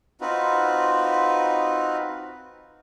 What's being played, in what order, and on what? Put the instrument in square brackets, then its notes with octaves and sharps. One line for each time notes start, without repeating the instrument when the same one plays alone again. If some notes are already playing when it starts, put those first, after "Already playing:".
[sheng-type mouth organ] C4 D#4 F4 F#4 B4